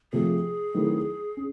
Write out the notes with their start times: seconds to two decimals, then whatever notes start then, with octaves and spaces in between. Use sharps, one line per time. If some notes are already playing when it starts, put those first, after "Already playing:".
0.13 C3 F3 A3 C4 G#4
0.74 D#3 F#3 A3 C4 E4
1.37 C#4